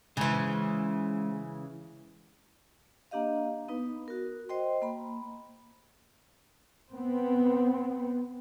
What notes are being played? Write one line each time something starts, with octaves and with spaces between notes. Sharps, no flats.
C#3 E3 G#3 C5
A#3 D4 G4 D#5 F5
B3 D#4 B4
F#4 A#4
C5 D#5 G5 C6
A#3 B5
B3 C4